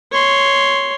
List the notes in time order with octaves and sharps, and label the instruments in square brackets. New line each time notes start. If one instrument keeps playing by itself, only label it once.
[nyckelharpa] C#5 C6